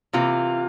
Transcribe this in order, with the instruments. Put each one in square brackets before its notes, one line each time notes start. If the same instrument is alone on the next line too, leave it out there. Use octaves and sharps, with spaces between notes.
[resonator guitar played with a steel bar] C3 E3 A#3 [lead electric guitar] F4